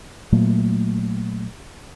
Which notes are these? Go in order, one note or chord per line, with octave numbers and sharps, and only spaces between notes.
A#2 F#3 A3 A#3